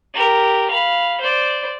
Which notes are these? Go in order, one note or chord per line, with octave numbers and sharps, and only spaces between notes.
G4 A#4
F5 B5
C5 D5